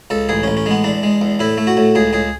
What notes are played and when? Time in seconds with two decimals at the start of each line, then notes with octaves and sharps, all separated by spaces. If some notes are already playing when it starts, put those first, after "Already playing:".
0.10 C#2 A4
0.29 A1 G#4
0.43 A1 C#4
0.57 C#4
0.66 G#3 B3
0.84 E2 D4
1.03 G#3
1.22 E2
1.40 A2 E4
1.58 A3
1.67 F#4
1.77 A2
1.95 C#2 G#4
2.13 C#2 G#4